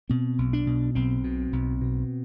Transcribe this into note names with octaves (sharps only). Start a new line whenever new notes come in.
B2 C4
B1
D4
B2
B1 C4
B2
B1
B2